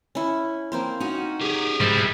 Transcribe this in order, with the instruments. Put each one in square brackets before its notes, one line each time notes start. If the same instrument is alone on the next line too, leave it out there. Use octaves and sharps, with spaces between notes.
[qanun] C#4 E4
A#3 C4 C5
[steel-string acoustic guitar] C#4 D#4 F#4
[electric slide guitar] G4 G#4
[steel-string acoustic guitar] G#2 [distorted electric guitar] G3 E4